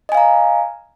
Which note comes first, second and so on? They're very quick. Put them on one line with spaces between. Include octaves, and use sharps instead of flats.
D#5 G#5 F5 A#5